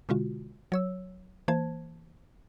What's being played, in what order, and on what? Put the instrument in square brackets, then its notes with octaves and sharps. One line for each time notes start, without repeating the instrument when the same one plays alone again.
[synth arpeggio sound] B2 D3 G#3 F4 F#4
F#3 C#5 E6
E3 A#3 C5 A5 G#6